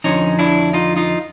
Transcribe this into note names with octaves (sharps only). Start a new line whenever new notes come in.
F2 D3 F3 C#4 D#4
D4 E4
D#4 F4
D#4 F4